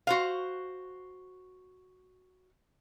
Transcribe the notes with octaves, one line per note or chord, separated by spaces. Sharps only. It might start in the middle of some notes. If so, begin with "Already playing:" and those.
F#4 C5 F5